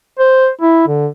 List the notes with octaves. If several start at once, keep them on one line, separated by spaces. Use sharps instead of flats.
C5
E4
D3